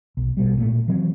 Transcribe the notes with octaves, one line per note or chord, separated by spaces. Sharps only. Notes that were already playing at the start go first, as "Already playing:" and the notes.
B1
A#1 B2 G3
A#2 A3 A#3
E3 F#3 C4